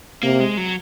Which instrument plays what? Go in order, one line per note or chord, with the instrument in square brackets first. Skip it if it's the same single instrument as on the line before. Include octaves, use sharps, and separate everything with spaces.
[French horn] C3 [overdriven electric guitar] A#3
[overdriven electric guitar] G#3
F#3